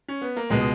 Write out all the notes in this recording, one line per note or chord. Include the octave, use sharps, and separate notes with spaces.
C#4
B3
A#3
C#2 B2 G#3